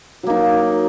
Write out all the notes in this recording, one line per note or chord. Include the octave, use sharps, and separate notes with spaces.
F#3 A#3 D#4